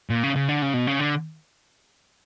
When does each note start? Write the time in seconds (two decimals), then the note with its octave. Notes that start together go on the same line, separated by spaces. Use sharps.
0.10 A#2
0.23 C#3
0.36 C#3
0.49 D3
0.62 C#3
0.74 B2
0.87 C#3
0.99 D3